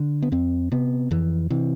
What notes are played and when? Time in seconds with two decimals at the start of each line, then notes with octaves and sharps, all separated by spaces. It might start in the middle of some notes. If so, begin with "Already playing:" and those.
Already playing: D3
0.23 B3
0.32 F2 C4
0.72 C3 B3
1.11 F2 E3
1.50 C3 E3